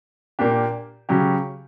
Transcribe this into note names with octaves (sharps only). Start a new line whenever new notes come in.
A#2 A#3 D4 G4
C#3 F#3 C#4 G4